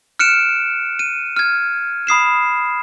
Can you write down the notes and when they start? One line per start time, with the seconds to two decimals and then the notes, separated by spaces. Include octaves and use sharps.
0.19 F6 F#6 C#7 D7 E7
0.99 D#7
1.36 F6 G#6
2.07 B5 D#6 C7 E7